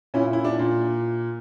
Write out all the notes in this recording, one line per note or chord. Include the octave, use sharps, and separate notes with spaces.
A#2 C#4 E4
E4
D4
A#2